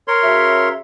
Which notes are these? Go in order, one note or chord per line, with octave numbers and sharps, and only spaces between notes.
A#4 C#5 C6
C#3 F#4 E5